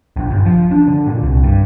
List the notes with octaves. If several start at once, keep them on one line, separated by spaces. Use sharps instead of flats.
A#1
G1
F3
D4
D3
A#2
C2
G2